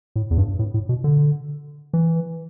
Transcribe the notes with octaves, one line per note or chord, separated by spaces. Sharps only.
A2
E2
G2
A2
A2
B2
D3
E3